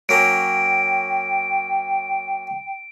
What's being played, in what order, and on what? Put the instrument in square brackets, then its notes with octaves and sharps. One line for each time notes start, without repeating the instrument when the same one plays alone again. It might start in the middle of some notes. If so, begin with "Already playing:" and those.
[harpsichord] F#3 A#3 C#4 [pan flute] G5 [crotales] D7